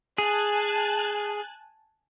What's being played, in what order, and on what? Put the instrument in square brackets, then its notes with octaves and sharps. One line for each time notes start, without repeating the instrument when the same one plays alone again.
[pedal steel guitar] G#4 [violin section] G#5 A5 F#6